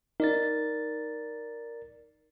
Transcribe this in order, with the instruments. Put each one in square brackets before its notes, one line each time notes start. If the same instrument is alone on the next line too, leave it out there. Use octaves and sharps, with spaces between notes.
[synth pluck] D#4 [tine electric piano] A#4 D5 A6